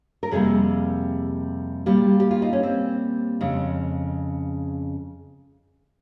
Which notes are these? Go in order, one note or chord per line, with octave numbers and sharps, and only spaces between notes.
A#4
F2 C3 G3 A#3 G#4
A#2 G3 A#3 G4
G4
F4
D#4
C#4
C4
F2 C#3 G#3